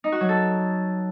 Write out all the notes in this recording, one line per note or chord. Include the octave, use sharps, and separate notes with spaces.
D#4
F#4
F#3
A4